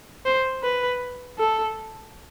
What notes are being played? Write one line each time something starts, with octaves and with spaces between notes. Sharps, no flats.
C5
B4
A4